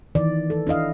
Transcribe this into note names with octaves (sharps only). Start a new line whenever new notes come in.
D#3 E3 D5
A4
D4 E4 D#5 F5